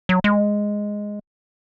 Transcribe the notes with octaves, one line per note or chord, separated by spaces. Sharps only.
F#3
G#3